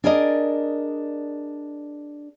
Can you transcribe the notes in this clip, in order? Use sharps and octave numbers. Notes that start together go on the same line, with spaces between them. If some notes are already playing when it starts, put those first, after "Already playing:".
D4 G#4 A#4 D5 D#5